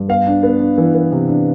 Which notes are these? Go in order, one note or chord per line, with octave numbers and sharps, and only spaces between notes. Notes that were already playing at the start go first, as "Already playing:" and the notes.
Already playing: G2
B3 F5
D4
B3
D4
E3
B3
C3
D4